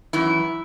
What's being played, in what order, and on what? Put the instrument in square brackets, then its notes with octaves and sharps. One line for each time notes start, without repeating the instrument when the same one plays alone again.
[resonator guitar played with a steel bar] F#2 E3 E4